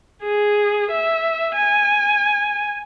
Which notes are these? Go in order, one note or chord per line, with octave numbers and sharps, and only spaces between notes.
G#4
E5
G#5